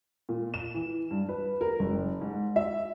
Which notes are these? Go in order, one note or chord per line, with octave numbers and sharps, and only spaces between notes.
A#2
E7
E3
G2
B4
A#4
F#1
G#2
E5